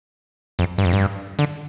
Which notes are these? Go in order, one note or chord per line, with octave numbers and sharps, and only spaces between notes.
F2
G2
F2
G2
D3